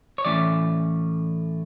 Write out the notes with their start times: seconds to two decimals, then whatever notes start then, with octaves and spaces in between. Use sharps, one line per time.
0.18 C#5
0.25 A2 E3 A3 C#4 D5